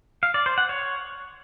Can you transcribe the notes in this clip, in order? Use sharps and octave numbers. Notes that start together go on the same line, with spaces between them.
F5
D5
C5
F#5
C#5